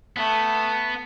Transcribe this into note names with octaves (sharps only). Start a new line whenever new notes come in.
A3 B3